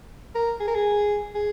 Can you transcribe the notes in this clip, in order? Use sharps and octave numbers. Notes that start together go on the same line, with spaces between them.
A#4
G#4
A#4
G#4
G#4